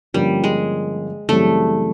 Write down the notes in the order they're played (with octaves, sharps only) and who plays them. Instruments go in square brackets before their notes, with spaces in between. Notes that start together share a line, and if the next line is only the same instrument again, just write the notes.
[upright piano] G2 D3 F3 A#3 C#4 [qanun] G3
[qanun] G#3
[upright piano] F#2 C#3 E3 G3 C4 [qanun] A3